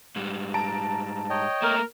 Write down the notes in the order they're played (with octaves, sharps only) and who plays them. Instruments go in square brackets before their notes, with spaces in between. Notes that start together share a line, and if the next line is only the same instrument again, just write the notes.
[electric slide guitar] G#2 G3
[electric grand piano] A5 A#5 D7
[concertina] C#5 D#5 G5
[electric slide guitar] A3 A#3 [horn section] A#4